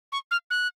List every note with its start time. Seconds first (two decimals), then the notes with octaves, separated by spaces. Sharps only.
0.12 C#6
0.31 F6
0.50 F#6